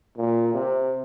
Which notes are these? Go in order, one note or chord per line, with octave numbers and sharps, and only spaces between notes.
A#2
C3